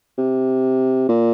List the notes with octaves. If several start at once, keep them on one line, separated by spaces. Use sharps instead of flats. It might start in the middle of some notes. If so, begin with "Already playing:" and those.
C3
A#2